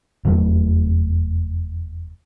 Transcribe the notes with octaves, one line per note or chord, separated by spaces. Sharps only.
F1 E2 F#3 A3